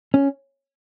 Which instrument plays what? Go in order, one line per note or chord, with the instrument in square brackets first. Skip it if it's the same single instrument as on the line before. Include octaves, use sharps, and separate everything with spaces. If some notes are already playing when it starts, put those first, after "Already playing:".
[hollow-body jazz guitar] C#4